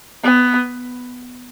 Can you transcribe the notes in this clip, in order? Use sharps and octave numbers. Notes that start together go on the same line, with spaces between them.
B3